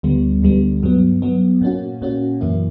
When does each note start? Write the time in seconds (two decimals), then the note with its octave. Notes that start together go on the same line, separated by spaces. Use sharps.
0.03 D2 D3 G3 B3
0.43 D2 D3 G3 B3
0.83 G2 F#3 B3
1.22 G2 F#3 B3
1.61 A#2 A#3 C#4 F#4
2.02 A#2 A#3 C#4 F#4
2.41 F#2 E3 A#3 E4